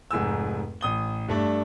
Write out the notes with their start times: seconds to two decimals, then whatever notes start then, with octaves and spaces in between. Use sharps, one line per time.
0.11 F1 G#2 G#5 E6
0.81 A1 D#6 G7
1.28 G2 A3 D4